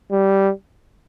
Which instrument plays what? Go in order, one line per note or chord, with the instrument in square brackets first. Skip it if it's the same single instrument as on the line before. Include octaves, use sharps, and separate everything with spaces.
[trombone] G3